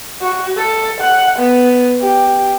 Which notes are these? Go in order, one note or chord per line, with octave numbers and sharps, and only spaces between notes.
F#4
A4
F#5
B3
G4